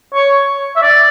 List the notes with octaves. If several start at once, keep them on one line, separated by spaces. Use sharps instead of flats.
C#5
E5
D5